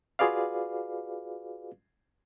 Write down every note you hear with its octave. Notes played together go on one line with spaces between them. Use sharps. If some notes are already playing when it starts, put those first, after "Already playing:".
F4 F#4 G#4 B4 D5 F5